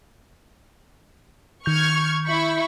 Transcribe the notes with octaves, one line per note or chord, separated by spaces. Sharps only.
D#3 C#6 F6 G6 G#6
E4 B5 C#6